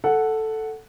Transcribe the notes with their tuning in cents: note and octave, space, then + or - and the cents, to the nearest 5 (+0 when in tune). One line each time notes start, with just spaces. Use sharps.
A4 +0 F#5 +0